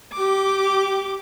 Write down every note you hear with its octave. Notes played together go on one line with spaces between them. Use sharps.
G4 D6